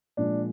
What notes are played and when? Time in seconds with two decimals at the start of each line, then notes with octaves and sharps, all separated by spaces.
0.17 A#2 F3 G#3 D4